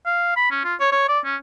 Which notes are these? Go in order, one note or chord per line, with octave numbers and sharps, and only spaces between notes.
F5
B5
C#4
F4
C#5
C#5
D5
C#4